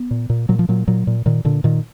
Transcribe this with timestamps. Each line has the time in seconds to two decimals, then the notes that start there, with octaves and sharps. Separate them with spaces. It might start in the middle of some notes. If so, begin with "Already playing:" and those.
Already playing: B3
0.11 A#2
0.30 A#2
0.49 A#2 F#3
0.59 F3
0.69 A#2 F#3
0.87 A#2 F#3
1.07 A#2
1.26 A#2 D#3
1.45 A#2 D3
1.64 A#2 D#3